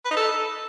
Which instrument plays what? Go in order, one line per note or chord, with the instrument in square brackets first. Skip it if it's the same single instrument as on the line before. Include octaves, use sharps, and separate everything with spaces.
[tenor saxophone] B4
D#4
A4